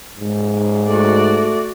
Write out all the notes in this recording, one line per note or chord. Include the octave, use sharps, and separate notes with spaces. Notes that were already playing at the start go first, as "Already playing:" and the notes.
G#2
A3 F#4 D5